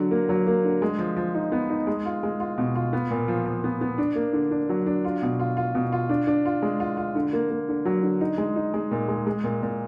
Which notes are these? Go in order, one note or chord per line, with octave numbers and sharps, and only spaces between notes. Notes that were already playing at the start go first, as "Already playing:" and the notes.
Already playing: D3 F#3
A#3
F#3
A#3
D3
G#3
F3
F3
D#4
B3
D#4
G#3
F4
G#3
F4
B2
F4
B3
A#2
F3
F3
B3
B3
D4
A#3
D3
D4
F#3
D4
F4
B2
F4
F4
B2
F4
D4
D4
F4
G#3
F4
F4
D3
A#3
A#3
D3
F#3
D3
D#4
G#3
D#4
G#3
A#2
G#3
G#3
A#2
A#2